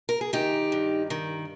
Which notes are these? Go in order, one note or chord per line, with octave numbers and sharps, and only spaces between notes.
A#4
G#4
D#3 D#4 G4
G2
D#3